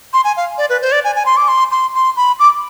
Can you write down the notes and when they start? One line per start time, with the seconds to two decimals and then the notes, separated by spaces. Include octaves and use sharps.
0.13 C6
0.24 G#5
0.37 F5
0.58 D5
0.70 B4
0.82 C5
0.92 D5
1.04 G#5
1.16 G#5
1.26 C6
1.37 D6
1.48 C6
1.71 C6
1.95 C6
2.17 B5
2.39 D6